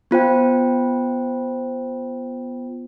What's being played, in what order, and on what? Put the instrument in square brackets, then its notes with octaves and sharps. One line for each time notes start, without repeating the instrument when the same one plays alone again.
[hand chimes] B3 F4 C5 G5